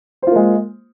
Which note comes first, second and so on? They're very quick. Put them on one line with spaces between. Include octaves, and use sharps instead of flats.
C5 F4 A#3 G#3